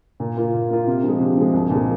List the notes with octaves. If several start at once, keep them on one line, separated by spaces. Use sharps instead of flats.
A#2
A#3 F4
A#2
A#3 F4
C3
F3 G#3
C3
F3 G#3
C2
A#2 F3 G#3